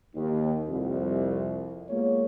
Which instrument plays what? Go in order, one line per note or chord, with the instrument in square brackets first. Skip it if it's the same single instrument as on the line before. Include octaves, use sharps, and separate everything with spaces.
[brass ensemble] D#2
C2 F2
G#3 A#3 B3 F4 C#5